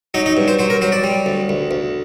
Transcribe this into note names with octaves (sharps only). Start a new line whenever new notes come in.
F#3 D#4
D#4
G2
C5
F#3 C5
A#4
F#3 C5
D5
G3
D2
D2
D2